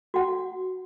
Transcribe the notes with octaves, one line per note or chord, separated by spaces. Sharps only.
F#4 F#5